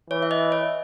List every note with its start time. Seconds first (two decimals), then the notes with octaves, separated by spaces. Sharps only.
0.10 E3 C#5
0.23 E5
0.31 D#5
0.52 C#5